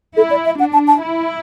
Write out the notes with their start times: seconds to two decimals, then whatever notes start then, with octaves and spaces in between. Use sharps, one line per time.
0.16 E4 A4
0.31 D5
0.46 E5
0.59 D4 F#5
0.73 A5
0.88 A5
1.01 E4